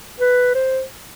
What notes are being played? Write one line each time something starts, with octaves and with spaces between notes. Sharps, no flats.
B4
C5